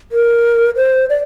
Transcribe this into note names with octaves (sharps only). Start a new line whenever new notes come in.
A#4
C5
D5